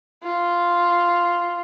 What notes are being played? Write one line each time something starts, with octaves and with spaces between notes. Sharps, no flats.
F4